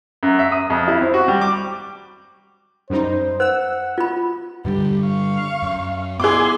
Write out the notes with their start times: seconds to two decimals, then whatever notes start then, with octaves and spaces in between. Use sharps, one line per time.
0.23 F#2
0.39 E5
0.52 D#6
0.70 F2
0.88 E4
1.01 C4
1.14 F#4
1.28 G3
1.41 D6
2.90 F#2 G3 D#4 C5
3.40 C5 F#5 E6
3.98 F4 B5
4.65 G2 D3 G3 G4
5.03 F5 C#6
5.62 F#2
6.20 B3 E4 G#4 C6 D6